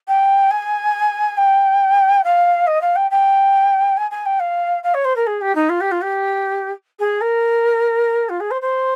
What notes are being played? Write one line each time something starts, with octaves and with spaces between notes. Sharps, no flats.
G5
G#5
G5
F5
D#5
F5
G5
G5
G#5
G#5
G5
F5
F5
C#5
C5
A#4
G#4
G4
D#4
F4
G4
F4
G4
G#4
A#4
F4
G#4
C5
C5